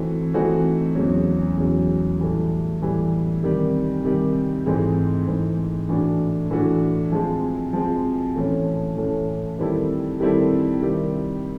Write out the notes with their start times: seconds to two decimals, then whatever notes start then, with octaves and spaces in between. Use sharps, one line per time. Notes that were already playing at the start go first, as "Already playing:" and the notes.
Already playing: E3 A3 C4 D#4 F#4
0.34 E3 A3 C4 D#4 F#4
0.95 E2 C#3 F#3
1.57 E2 C#3 F#3
2.19 A2 E3 G3
2.81 A2 E3 G3
3.43 C3 D#3 G3
4.04 C3 D#3 G3
4.66 G#2 E3 A3 C4 D#4
5.27 G#2 E3 A3 C4 D#4
5.89 A2 E3 A3 D4 F#4
6.50 A2 E3 A3 D4 F#4
7.12 F3 G#3 C4
7.73 F3 G#3 C4
8.35 A2 E3 A3 C#4
8.97 A2 E3 A3 C#4
9.59 D#3 G3 C4 E4 A4
10.20 D#3 G3 C4 E4 A4
10.82 C3 D#3 G3